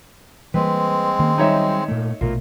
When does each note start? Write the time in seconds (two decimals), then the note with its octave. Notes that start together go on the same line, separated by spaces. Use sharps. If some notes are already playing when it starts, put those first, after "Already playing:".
0.54 E3 G3 G#3 A#3 C4 B4
1.19 D#3 A#3 C#4
1.38 F#3 G3 D#4 C#5 E5
1.88 A#2 A3
2.21 A#1 B2 A3 F4 A#4